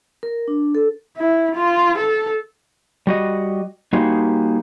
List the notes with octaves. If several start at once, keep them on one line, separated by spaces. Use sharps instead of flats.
A#4
D4
A4
E4
F4
A4
G3 F#4 D#5
G3 A#3 D#4 F#4 G#4 C5